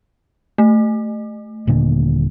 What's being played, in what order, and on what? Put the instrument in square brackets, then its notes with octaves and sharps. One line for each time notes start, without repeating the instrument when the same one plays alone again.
[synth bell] A3
[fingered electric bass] D#1 A#2 D3